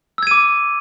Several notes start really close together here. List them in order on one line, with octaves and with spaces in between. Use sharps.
E6 G#6 D#7 D6